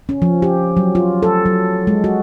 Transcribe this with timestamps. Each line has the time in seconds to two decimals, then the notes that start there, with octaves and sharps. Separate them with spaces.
0.09 C#4
0.22 F3
0.42 G4
0.77 F#3
0.95 F4
1.23 A4
1.46 F#3
1.87 G#3
2.04 F#4